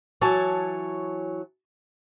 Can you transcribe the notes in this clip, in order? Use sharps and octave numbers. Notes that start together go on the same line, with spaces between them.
E3 F#3 C#5 G#5 A5